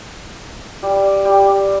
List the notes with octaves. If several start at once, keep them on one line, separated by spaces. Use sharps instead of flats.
G3
G3